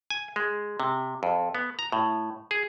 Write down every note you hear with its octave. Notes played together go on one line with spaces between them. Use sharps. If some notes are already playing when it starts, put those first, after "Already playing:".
G#5
G#3
C3
F2
B3
A#5
A2
G#4